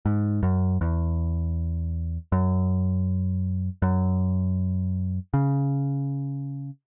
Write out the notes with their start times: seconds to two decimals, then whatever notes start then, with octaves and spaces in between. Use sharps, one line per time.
0.06 G#2
0.43 F#2
0.81 E2
2.32 F#2
3.82 F#2
5.34 C#3